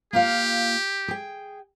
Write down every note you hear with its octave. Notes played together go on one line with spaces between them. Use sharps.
A#3 F4 G4 F5
G#4 G5